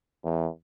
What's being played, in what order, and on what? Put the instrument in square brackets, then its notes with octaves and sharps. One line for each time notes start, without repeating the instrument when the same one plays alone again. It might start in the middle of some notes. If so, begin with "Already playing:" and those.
[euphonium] E2